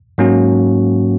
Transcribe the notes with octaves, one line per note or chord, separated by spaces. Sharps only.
G#2 F#3 A#3 C#4 F#4